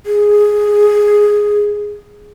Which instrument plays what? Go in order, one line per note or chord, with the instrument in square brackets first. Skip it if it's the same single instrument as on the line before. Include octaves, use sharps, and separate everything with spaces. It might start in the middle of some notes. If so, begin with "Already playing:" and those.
[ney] G#4